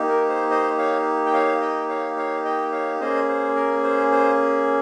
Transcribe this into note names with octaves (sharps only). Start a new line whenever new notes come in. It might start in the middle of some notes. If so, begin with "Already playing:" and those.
Already playing: A#3 D#4 G4
A#4
C5
C5 D#5
C#5 F5
G5
C#5 F5
D#5 G5
C#5 F5
C#5 F5
D#5 G5
C#5 F5
A#3 C#4 G#4 C5 D#5
C5
A#4
C5
C5